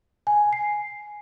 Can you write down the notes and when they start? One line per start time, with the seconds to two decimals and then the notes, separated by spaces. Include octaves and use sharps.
0.27 G#5
0.53 C7